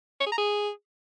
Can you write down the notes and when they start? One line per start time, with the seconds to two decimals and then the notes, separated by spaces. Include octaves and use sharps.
0.20 C#5
0.26 G#4
0.32 A#5
0.38 G#4